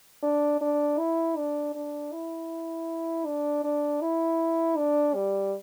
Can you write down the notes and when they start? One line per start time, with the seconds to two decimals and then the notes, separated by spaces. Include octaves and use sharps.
0.23 D4
0.61 D4
0.99 E4
1.37 D4
1.75 D4
2.12 E4
3.26 D4
3.64 D4
4.01 E4
4.77 D4
5.15 G3